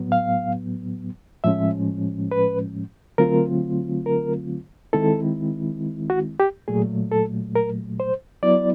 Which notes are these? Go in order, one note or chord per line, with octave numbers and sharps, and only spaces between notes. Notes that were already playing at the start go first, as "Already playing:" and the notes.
Already playing: A2 F#3 B3
F5
A2 F3 G#3 C#4 E5
B4
D3 F#3 A3 C4 F4 A#4
A#4
D#3 G#3 C4 E4 A4
F#4
G4
A#2 F#3 A3 G#4
A4
A#4
C5
F#3 B3 E4 D5